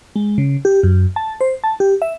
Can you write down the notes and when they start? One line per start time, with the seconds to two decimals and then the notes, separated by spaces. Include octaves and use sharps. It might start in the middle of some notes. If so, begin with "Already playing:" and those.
0.16 G#3
0.38 C#3
0.65 G4
0.83 F#2
1.16 A5
1.41 C5
1.64 A5
1.80 G4
2.02 E5